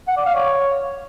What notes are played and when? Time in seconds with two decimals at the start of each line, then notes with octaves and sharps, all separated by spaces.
0.08 F#5
0.17 D5
0.26 F5
0.35 C#5